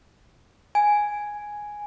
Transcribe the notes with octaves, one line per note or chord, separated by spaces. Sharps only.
G#5